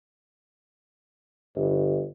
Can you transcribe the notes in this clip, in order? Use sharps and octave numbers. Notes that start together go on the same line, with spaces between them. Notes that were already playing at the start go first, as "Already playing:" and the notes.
G1